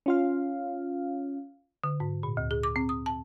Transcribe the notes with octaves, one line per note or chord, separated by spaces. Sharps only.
C#4 F4 F5
D3
G#2
A#2
D2
G#4
D6
C4
D#6
A5